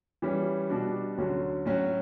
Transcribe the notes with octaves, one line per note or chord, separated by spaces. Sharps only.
E3 G3 C#4
B2 G3 D4 F#4
D2 D3 F#3 C#4 F#4
A2 F#3 C#4 F#4